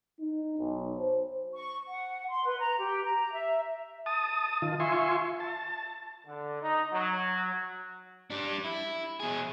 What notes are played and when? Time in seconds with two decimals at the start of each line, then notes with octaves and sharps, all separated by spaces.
0.20 D#4
0.58 B1
0.98 C5
1.54 C#6
1.88 F#5
2.29 C6
2.46 B4
2.59 A#5
2.78 G4
3.03 A#5
3.33 E5
4.06 A5 D#6
4.62 D#3 F4
4.80 F4 E5 G#5 C6 C#6
5.40 A5
6.26 D3
6.62 D#4
6.92 F#3
8.30 G3 D4
8.64 E4
9.19 B2 G#4